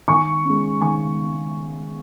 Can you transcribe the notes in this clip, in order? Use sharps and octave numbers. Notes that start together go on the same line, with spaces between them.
D#3 G#5 C#6
G#3 C#4
D#3 G#5 C#6